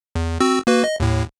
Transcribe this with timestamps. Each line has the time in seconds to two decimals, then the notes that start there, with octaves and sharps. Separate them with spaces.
0.15 E2
0.40 C4 F#4 E6
0.67 A#3 F#4 B4
0.84 D#5
1.00 D#2 A2